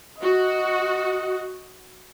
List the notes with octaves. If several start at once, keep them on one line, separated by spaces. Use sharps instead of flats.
F#4 D#5